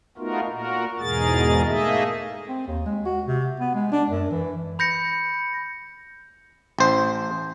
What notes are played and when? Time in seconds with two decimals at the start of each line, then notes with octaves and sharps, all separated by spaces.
0.18 A3 B3 D#4 F4 F#4 A#4
0.49 A#2 F#4 A#4
1.00 E2 G#2 B2 G#4 A#4 A6
1.66 A3 A#3 D#4 G#4 D#5 E5
2.48 C4
2.67 D#2
2.86 G#3
3.05 F#4
3.26 C3
3.60 B3
3.74 G#3
3.92 D4
4.09 F#2
4.31 E3
4.79 B5 G6 A#6 C#7
6.79 A1 C5